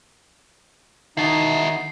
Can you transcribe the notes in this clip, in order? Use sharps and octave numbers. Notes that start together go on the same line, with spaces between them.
D#3 D#4 E4 F#4 A5 C7